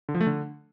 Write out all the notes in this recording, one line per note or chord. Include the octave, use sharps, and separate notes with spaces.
D3
F3
A3
D3